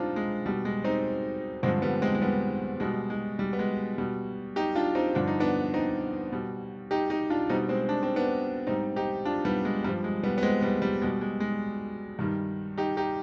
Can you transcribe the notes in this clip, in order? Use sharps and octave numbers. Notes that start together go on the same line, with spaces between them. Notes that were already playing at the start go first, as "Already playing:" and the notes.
Already playing: G#2 G3 C4 D4 D#4 F4
G#3
B2 G3
G#3
C4 D#4
G2 D3 F3 G#3 C4
G3 B3
G#3 C4
G#3
G3 B3
B2 G3 G#3
G#3
G3
B3
G#3
B2 G3
D#4 G4
D4 F4
C4 D#4
G2 D3 F3 D4
D#4
B3 D4
C4 D#4
B2 G3
D#4 G4
D#4 G4
D4 F4
B2 G3 C4 D#4
G#3 C4
D4
C4
B3 D4
G#2 G3 C4 D#4
D#4 G4
D4 F4
G3 B3
G#3
G2 F3 G3
G#3
G3 B3
B3
G#3 C4
G3 B3
G3
B2 G3 G#3
G#3
G#3
G2 D#3 G3
D#4 G4
D#4 G4